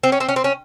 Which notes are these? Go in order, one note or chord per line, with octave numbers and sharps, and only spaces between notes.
C4
C#4
C4
C#4
C4
C#4